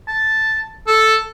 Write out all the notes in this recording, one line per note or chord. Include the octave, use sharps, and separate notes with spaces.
A5
A4